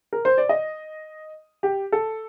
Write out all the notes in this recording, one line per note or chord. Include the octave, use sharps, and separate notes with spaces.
A#4
C5
D5
D#5
G4
A4